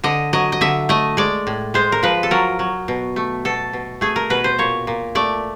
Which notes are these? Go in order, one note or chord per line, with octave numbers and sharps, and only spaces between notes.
D3 D#5
F#3 D#5
D#5
D3 E5
A3 D#5
G#3 D5
A2
G#3 C5
A#4
F3 B4
A4
F#3 A#4
F#3
B2
A3
B2 A4
B2
A3 G#4
A#4
B2 B4
C5
A#2 C#5
A#2
A3 D5